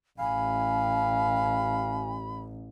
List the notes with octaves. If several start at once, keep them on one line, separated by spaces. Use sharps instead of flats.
A1 F5 G#5 B5